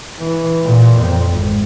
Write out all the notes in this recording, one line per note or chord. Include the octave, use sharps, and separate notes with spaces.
E3
A#2
F2
G#1